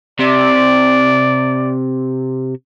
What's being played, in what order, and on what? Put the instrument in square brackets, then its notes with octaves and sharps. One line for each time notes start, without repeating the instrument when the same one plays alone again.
[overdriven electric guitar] C3 [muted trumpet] D5